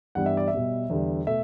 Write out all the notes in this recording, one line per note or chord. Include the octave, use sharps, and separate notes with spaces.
G2 E3 G3 B3 F#5
E5
D5
E5
B2 G3 B3
E2 D3 G3
B2 A3 E5